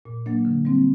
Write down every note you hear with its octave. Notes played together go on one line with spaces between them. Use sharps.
A#2
F#3 A#3 D4
D3
G3 C4